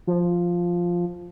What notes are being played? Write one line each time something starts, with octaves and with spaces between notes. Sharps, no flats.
F3